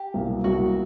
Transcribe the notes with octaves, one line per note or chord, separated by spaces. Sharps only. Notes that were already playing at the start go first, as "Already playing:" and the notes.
Already playing: G4
C2 B2 F#3 A#3
C2 B2 F#3 A#3 F#4